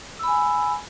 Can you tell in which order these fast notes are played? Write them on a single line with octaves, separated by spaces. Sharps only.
E6 B5 G#5